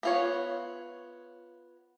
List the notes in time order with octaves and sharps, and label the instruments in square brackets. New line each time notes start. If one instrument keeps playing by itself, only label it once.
[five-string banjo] B3 F4 C#5